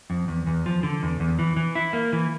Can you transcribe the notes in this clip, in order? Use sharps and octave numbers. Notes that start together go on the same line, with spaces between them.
F2
E2
E2
F3
D3
E2
E2
E3
E3
E4
A#3
E3